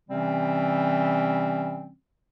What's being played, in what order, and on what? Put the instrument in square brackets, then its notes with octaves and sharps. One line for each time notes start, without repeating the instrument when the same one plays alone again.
[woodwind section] C3 E3 G3 C4 C#4